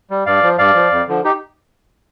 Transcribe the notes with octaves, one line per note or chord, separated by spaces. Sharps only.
G3
G2 D5 F5
F3
G2 D5 F5
F3
F2
D3 F3
D#4 G4